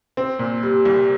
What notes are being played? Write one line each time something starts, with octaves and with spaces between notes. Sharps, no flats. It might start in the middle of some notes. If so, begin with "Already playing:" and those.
C4
A#2
G3
C2